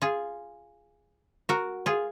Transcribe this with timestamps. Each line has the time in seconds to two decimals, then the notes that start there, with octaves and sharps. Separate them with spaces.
0.02 F4 G#4
1.49 F#4 A#4
1.86 F4 G#4